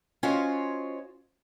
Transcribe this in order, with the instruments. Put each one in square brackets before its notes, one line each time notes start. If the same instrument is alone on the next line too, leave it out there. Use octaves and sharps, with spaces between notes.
[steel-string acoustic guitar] C#4 F4 F#4 C5 C#5 D#5